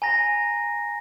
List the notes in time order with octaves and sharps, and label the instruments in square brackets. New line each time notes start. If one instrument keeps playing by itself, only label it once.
[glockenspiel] G#5 A#5 A#6